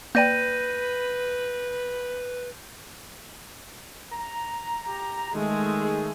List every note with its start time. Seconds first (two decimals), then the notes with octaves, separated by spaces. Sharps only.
0.15 A#3 B4 D5 G5 G6 A#6 D#7
4.12 A#5
4.86 G4
5.34 D#3 G#3 A3 G#4